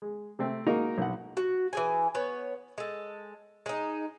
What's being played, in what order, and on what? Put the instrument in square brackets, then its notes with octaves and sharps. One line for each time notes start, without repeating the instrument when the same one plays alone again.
[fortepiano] G#3
C3 A3 C4
G#3 A#3 D#4 F#4 A#4
B1 F#5
[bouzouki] F#4
E3 G#4 G#5
B3 C#5
G#3 A4
G#3 D#4